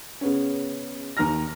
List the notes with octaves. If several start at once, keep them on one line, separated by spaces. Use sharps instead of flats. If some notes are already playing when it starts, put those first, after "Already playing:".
C#3 B3 C#4
D#2 D#3 A#5 F6 A#6